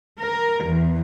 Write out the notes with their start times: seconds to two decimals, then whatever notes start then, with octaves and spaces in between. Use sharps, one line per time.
0.19 A#4
0.65 E2